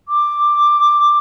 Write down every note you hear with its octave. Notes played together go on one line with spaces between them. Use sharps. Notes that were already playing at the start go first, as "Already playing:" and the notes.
D6